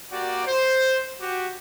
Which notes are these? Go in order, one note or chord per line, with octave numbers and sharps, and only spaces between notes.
A#3 F#4 G4 D5
C5
F#4 G4